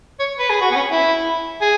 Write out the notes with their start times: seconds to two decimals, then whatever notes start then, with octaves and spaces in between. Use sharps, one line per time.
0.20 C#5
0.39 B4
0.50 G#4
0.61 F#4
0.71 B3
0.76 C#4
0.91 E4
1.61 G#4